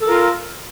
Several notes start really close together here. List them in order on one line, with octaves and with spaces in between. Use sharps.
A4 A#4 F4